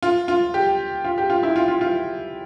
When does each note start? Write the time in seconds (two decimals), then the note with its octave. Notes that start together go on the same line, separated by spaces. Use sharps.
0.03 F4
0.28 F4
0.54 G4
1.04 F4
1.18 G4
1.30 F4
1.43 E4
1.56 F4
1.68 F4
1.81 F4